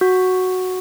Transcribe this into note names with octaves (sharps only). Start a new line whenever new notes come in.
F#4